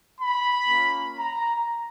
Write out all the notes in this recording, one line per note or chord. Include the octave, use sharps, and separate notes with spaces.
B5
A#3 C#4 F4
A#5